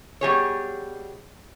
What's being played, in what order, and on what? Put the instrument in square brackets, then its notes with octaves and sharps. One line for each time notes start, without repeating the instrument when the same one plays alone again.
[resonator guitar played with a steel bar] B2 G3 G#4 C#5